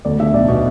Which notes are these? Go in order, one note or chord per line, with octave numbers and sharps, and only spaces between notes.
D2 D5
D3 E5
B1 D5
B2